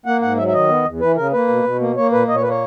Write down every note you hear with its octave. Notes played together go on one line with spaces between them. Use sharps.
A#3 F#5
G#2 F#5
F#3 E5
E5
D#3 D#5
B3
E2
E3 B4
C#3 A#4
A#3 B4
B2
B2
A#3
A#3 C#5
A#2 B4
A#2 D#5
C#5
A#3 B4
C#5